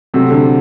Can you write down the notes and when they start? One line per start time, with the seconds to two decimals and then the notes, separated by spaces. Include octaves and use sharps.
0.14 C3 F#3 A3 C4 F#4 A4
0.31 D3